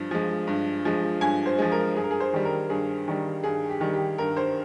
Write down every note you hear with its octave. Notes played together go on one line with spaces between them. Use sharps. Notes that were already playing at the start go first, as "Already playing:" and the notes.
Already playing: G2 F3
F3 G#3
G2
F3 G#3
G2 G#5
C5
F3 G#3
A#4
G2 G#4
A#4
G#4
C5
D#3 G3
A#4
G2 G#4
D#3 G3
G2 G#4
G4
D#3 G3
G4
G2 A#4
C5